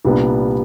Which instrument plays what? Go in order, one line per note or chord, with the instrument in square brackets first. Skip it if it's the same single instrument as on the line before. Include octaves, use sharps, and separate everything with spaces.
[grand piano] C2 A#2 G3 B3 D4